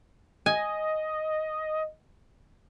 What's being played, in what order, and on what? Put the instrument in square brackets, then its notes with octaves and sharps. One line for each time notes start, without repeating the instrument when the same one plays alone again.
[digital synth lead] D#5 [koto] G#5